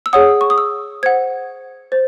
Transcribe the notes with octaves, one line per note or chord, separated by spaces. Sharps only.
E6
G#4 C#5 F#5 D#6
C#6
D#6
E6
C5 F#5 G#6
C5 A6